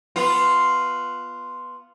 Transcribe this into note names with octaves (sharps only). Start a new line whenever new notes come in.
B3 F4